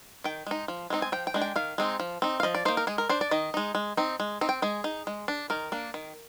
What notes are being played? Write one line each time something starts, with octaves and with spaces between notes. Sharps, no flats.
D#3 G5
G#3 D#4
F3
G#3 C4 D#4
G#5
F3 G5
G5
G#3 D4
G5
D#3 F5
G#3 C4 D#4
F3
C4 D#4
F5
F3 D#5
D5
A#3 D#4 C5
A#4
G#3 G#4
A#4
D4 C5
D5
D#3 D#5
G#3 D#4
G#3
C4 D#4
G#3
C4 D#4
G5
G#3 G#4
D#4
G#3
D4
D#3 A#4
A#3 D4
D#3